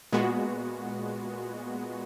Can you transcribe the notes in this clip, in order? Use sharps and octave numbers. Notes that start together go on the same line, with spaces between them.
A#2 G#3 B3 F#4